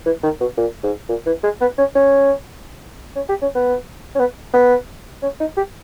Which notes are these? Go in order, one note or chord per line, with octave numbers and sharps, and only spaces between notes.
E3
D#3
B2
A#2
G#2
A#2
E3
G#3
B3
C#4
C#4
C#4
G4
C#4
B3
C#4
B3
B3
C#4
D#4
G4